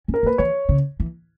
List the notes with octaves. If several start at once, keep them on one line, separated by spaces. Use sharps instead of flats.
C#4
A#4
A#3
B4
E3 C#5
C#3
E3